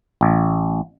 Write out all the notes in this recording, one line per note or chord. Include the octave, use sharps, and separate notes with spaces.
A1